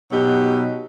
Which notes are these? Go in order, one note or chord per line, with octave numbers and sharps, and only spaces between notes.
B2 F#3 D#4 G4